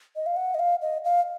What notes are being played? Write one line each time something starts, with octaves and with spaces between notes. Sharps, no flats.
D#5
F5
F#5
D#5
F5
D#5
F5